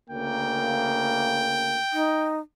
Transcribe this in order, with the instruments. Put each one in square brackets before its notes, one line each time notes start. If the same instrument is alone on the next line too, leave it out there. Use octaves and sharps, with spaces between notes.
[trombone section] D2 C#3 A#3 [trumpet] G5
[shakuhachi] D#4